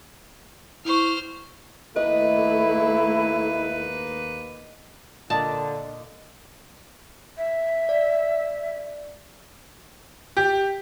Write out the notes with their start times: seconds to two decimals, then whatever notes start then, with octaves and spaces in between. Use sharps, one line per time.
0.85 E4 C5 C#6 F6
1.96 D#2 A3 A#3 E4 B4 D#5
5.30 A#2 D3 F4 D5 D#5 A5
7.37 E5
7.89 D5
10.37 G4